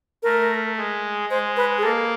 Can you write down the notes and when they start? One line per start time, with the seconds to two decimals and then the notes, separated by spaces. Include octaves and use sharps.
0.23 A3 A#4
0.77 G#3
1.29 G#3 C5
1.56 B4
1.78 G#4
1.83 A#3 A4